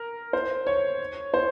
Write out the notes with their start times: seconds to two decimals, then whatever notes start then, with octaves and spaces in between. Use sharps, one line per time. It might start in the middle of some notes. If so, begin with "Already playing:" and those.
Already playing: A#4
0.33 C5
0.67 C#5
1.34 C5